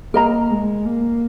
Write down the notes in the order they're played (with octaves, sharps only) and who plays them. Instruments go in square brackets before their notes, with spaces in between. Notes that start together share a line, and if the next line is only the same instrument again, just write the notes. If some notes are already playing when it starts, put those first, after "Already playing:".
[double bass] A#3 [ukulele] A#4 D#5 A#5
[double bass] G#3
A#3